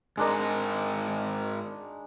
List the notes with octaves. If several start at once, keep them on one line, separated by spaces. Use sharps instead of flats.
G#2 G#3 D4 D#4 A#4